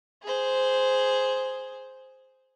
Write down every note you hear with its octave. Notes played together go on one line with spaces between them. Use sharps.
G#4 C5